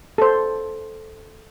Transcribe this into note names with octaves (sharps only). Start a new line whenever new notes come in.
A4 C5